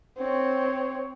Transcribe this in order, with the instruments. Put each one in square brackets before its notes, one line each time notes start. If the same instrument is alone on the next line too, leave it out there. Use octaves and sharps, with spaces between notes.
[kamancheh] C4 C#5